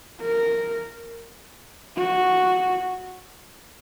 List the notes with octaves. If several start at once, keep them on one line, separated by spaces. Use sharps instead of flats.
A#4
F#4